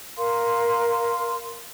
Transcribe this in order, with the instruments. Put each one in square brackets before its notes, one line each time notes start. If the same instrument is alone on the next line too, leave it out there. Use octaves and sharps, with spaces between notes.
[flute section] A#4 F5 C6